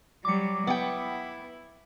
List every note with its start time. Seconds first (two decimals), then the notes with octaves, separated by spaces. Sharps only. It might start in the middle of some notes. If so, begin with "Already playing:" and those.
0.25 F#3 G3 D6 C#7
0.67 B3 E4 G5